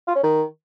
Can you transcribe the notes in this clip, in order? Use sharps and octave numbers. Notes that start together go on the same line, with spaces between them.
F4
C#4
D#3